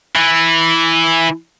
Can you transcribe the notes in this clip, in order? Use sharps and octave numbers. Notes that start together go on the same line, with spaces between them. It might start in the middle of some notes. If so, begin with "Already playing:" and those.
E3